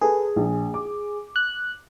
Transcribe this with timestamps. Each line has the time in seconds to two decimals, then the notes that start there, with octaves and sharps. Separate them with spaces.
0.01 G#4 A4 B4
0.36 A#1
0.74 D6
1.36 F#6